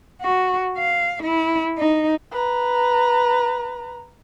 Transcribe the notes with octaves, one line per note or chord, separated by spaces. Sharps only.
F#4
F5
E4
D#4
B4 A#5